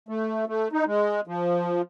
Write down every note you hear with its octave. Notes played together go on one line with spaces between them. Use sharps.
A3
A3
D#4
G#3
F3